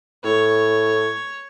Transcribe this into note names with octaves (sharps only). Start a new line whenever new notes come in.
A2 C#5